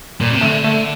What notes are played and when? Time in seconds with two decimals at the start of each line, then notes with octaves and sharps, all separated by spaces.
0.21 A#2
0.31 C3
0.41 D3 A3
0.64 A3